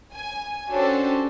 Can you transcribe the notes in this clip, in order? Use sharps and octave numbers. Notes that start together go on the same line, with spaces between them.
G#5
C#4 D4 F#4 G4 A4 C5